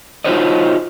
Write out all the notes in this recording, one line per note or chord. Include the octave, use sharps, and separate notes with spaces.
D#4 F4 F#4 C5 C#5 D#5